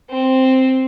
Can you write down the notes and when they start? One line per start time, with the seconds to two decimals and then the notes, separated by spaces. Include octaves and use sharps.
0.10 C4